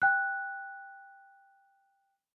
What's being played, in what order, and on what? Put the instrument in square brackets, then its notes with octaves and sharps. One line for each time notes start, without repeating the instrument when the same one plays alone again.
[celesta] G5 F#6